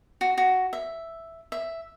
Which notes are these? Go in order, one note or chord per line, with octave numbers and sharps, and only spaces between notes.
F#4
F#4
E5
E5